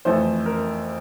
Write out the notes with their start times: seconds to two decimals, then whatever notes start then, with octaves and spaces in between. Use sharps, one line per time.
0.05 F2 E3 A3 C4 C5
0.46 A#4